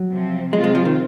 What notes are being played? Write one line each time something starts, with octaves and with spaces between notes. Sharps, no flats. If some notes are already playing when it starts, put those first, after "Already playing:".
Already playing: F#3
C3 F3 C4
C3 F#3 G#3 C4 F4
G#3
F3
D#3